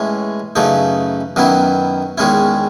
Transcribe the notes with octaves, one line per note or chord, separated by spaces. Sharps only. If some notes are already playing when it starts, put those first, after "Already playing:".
Already playing: A2 E3 G#3 C#4 E4
F#2 C#3 E3 A3 D#4
F#2 D#3 F#3 B3 E4
E2 D#3 G#3 C#4 E4